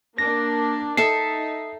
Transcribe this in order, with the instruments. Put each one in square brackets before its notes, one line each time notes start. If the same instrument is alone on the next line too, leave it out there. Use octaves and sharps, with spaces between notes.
[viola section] A#3 D4 A#4 [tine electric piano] A#6
[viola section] D#4 [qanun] A4 E5 A5 [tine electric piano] C7